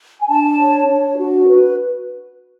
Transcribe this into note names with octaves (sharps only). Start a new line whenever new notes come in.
G#5
D4 A5
C#5
D4
F#4
B4